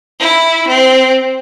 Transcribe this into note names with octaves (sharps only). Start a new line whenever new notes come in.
E4
C4